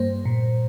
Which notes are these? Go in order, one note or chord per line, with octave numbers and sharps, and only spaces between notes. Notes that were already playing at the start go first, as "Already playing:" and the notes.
Already playing: G2 G3 A#3 C5
A#2